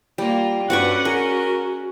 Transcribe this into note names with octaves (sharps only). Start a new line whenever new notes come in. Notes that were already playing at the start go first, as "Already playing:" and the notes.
G3 A#3 F4
G2 C#4 F#4 B4 D5 F#5 C#6
F#4 G#4 A#4